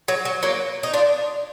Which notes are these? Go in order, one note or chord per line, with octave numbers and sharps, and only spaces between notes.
F#3
F#3
F#3 A#3
D#4
D4 F4